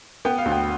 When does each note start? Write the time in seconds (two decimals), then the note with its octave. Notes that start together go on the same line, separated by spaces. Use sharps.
0.25 B3 G5
0.38 F5
0.46 D2
0.52 G5